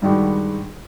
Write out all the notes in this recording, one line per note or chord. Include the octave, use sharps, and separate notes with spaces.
G2 D#3 G3 G#3 D#4 F#4